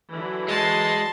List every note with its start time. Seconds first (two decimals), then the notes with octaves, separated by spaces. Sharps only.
0.13 D3 E3 F#3
0.48 G#3 A5 C6